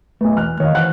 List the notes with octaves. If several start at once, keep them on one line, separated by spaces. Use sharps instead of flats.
B1 A3 B4
E2 F6 F#6
D#3 C#5 D#5 F5
E3 C5 F#5 F#6